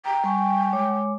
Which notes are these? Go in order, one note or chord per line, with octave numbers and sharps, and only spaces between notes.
G5 A#5
G3 G#5 C#6
G#3 C#5 D6